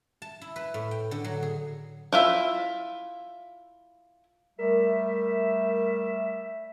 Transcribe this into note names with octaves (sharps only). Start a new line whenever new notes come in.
A5
E4
B4
A2
G5
D3
F#3
G#4
E4 F4 E5
G3 A3 A#4 E5